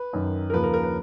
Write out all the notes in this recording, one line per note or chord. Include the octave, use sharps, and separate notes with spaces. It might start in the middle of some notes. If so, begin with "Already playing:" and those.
Already playing: B4
F#2 D#3
A#4
D#2 C#3 F3 B4
A#4
A#4
B4